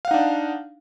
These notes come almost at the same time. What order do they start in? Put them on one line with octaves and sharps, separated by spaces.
F5 F#5 D#4 D4